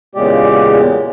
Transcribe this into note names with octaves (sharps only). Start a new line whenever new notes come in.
E2 A#2 C#3 G#3 G4 D5